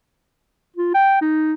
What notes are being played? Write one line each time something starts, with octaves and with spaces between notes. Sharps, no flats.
F4
G5
D#4